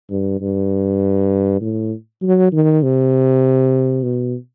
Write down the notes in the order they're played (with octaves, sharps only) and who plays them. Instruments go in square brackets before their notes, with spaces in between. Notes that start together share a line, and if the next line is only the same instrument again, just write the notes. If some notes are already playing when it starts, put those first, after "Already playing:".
[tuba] G2
G2
A2
F#3
D#3
C3
B2